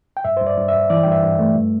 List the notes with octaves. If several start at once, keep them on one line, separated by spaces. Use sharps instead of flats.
G5
G2 E5
G2 C5
D5
G2
E5
G2
E3 D5
G2 G5
E5
G2
A3
G2